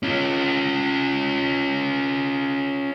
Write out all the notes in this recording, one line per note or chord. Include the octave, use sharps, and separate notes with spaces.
C#4 F4